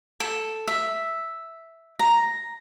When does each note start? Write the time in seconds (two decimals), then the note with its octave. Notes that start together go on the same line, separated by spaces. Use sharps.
0.20 A4
0.68 E5
1.99 A#5